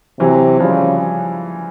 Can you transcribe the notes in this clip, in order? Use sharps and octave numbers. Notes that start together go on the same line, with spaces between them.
C3 E3 F#3
C#3 F3 G3